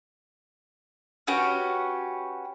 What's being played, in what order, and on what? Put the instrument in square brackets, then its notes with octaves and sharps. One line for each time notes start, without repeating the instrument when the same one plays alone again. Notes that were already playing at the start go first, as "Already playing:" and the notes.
[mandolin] C#4 F#4 G4 B4